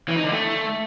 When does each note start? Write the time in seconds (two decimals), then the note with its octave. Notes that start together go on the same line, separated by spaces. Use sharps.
0.08 E3
0.16 D#4
0.24 D3
0.32 A3